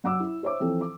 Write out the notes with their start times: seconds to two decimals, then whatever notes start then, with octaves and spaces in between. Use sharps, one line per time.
0.04 F#2 F#5 D6 E6
0.20 E4
0.43 C5 C#5 E5 D6
0.60 E3 F3 C4 A4
0.81 D6